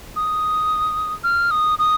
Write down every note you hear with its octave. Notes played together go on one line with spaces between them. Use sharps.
D#6
F6
D#6
D#6